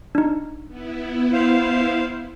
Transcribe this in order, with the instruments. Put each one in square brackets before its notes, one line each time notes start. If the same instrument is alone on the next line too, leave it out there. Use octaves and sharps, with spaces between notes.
[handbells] D4 D#4
[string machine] B3 E4
[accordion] C5 F5